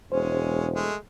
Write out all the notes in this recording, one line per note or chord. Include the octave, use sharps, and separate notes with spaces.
E1 G#3 C#4 C5
G#3 A3